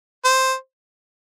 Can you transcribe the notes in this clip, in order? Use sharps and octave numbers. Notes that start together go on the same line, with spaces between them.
C5